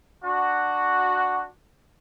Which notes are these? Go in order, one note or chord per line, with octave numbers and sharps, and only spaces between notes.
D4 F#4